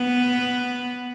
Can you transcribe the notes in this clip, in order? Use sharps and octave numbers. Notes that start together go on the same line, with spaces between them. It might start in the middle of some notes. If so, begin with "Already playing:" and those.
Already playing: B3